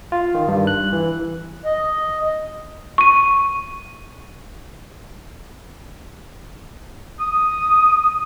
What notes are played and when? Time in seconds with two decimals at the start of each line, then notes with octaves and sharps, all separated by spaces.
0.12 F4
0.35 D#3
0.48 G2
0.67 F#6
0.93 E3
1.65 D#5
2.98 C#6 D#7
7.20 D#6